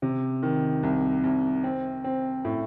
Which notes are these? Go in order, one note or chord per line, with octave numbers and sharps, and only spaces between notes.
C3
D#3
C2
C2
C4
C4
A2